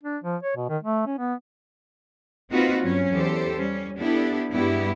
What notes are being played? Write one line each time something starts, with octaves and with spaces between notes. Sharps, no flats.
D4
F3
C#5
B2
D#3
A3
C#4
B3
A#3 C4 D#4 F4 F#4 B4
G2 F#3 C#4
E2 G4 A4 C5
G3 C#4
B3 D4 E4 G4 A4
G2 G3 G#3 B3 E4 G4